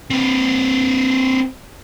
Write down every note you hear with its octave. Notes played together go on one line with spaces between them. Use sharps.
C4 B4